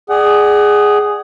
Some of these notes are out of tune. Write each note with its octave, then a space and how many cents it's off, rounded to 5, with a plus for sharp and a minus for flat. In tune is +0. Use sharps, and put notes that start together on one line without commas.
G#4 +0 D5 +30 F#5 +30